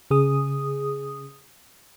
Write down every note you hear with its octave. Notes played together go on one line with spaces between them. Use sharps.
C#3 G#4 D#6